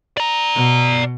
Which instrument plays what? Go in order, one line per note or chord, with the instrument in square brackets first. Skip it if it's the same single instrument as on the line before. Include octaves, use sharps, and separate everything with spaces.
[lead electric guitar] D5 A#5
[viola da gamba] B2